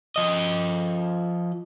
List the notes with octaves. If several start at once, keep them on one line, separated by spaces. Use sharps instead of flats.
F3 D#5